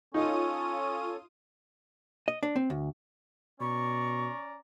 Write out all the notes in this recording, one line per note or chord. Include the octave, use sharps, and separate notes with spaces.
C#4 D#4 F4 A4 C#5 D#6 D#7
D#5
D4
C4
D2
B2 C#4 D5 A#5 C#6